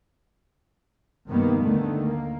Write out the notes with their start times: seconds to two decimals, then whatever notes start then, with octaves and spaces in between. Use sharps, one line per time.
1.28 G2 C3 D#3 G3 A#3 B3
1.61 D2 D3 D#3 A3
2.03 A#3